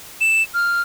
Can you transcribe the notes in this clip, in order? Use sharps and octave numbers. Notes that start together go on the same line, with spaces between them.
E7
F6